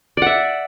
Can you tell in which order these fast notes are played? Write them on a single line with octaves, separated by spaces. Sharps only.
D5 F#5 E5